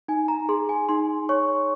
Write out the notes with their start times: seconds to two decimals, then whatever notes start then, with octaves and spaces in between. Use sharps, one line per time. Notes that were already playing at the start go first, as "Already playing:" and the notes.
0.08 D#4 G#5
0.28 A#5
0.49 G#4 C6
0.69 G#5
0.89 D#4 C6
1.29 C#5 C#6